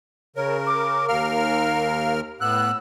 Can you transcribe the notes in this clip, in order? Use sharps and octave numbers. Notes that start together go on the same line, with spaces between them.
C#3 A#4 C#5
D6
D#2 A#4 F5 F6
A2 B3 E6 F#6